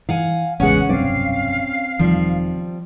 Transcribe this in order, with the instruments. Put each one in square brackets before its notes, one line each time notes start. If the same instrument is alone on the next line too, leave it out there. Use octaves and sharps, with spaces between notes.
[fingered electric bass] E3 [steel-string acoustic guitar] F5 F#5 G#5
[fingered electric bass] A1 C#3 [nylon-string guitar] E2 G#3 G#4 [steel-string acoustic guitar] C#4 [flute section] F#5
[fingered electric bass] F1 B1 G2 [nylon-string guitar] C4 D5 [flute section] F5
[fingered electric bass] E1 D#3 [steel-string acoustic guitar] F3 G3